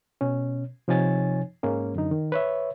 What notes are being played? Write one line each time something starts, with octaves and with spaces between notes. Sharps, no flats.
B2 C#4
C3 F3 D#4 C#5 G#5 A6
G#2 G#3 A#3 C#4
F#2 D3 D#4
D#3
B4 C#5 E5